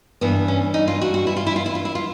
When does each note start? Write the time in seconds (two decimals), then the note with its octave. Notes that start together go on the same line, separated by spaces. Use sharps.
0.21 G2 E3 B3
0.48 C#4
0.74 D#4
0.88 F4
1.01 F#4
1.14 F#4
1.27 E4
1.36 F4
1.46 E4
1.56 F4
1.66 E4
1.75 F4
1.85 E4
1.95 F4